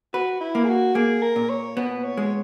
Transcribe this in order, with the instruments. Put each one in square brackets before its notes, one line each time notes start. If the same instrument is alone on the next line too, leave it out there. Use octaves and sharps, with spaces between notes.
[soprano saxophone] F#4 [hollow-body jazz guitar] B4
[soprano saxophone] E4
[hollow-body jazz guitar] A#3
[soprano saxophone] G#4
F#4
[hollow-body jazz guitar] A#3 [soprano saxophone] G#4
[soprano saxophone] A#4
[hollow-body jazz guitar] A#2
[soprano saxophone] C#5
[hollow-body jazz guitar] B3 [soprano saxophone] B4
[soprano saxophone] C#5
[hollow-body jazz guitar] G#3